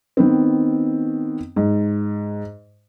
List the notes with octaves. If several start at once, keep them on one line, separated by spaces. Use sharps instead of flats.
D#3 B3 C4
G#2